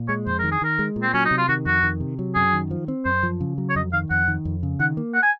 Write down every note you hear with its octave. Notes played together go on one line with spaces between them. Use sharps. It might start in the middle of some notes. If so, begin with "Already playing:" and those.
Already playing: A#2
G#3 C#5
F2 C5
D#3 A#4
G#4
D#3 A#4
G#3
A#2
C4
F#3 C#4
D#4
C3
F4
D#3 F#4
F2 F#4
D#3
C3
F#3
F#2 G#4
D#3
F3
C4
F#2 C5
F3
C#3
F#3
C#5
F2 D#5
D#3 F5
F2 F#5
D#3
F2
C#3
D#3 F#5
A#3
F#5
G#5